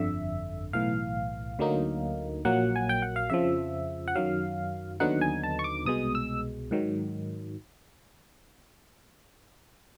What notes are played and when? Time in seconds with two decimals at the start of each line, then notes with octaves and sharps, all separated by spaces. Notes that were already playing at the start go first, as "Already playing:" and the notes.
Already playing: G1 F2 D3 E5
0.73 B1 A2 E3 F5
1.59 D2 D3 F#3 A#3 D#4
2.45 A#1 A#2 F#3 A#3 F#5
2.76 G#5
2.89 G5
3.02 F#5
3.16 F5
3.30 F2 C#3 F3 E5
4.08 F#5
4.15 F#2 D#3 F#3 F5
5.00 D#2 D3 F#3 B3 D#4 F#5
5.21 G#5
5.43 A5
5.59 C#6
5.64 D6
5.85 C2 B2 G#3 D#6
6.15 E6
6.71 G#2 D#3 F#3